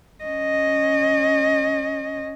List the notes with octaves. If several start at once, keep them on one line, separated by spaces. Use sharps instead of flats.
C#4 D#5